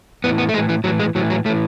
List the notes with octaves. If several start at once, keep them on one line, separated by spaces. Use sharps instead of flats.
A2 E3 B3
B3
A3
A2 E3 G#3
E3
A2 E3 F#3
G#3
A2 E3 F#3
F#3
A2 E3 A3